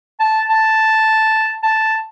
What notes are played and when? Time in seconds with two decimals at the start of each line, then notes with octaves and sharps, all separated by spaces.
0.20 A5
0.49 A5
1.63 A5